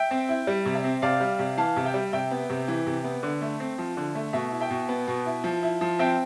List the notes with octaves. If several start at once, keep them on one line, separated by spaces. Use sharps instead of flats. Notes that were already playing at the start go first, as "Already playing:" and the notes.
Already playing: E5 G5
C4
E4
G3
C3
E5
C4
C3 D5 F5
G3
C3
E3 F5 A5
C3
E5 G5
G3
C3 E5 G5
B3
C3
E3
C3
B3
D3
A3
C4
F3
D3
A3
B2 E5
E4
E5 G5
B2
B3
B2
E4
F3
E4
F3
C4 E5 G5